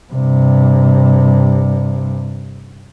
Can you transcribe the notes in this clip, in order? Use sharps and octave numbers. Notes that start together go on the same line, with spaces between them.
G2 C3